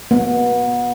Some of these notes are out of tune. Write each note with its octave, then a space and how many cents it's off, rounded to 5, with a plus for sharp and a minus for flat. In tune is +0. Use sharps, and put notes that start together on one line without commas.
B3 -30